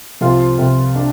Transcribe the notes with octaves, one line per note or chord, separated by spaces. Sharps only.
C2 F3 F4
C2
D4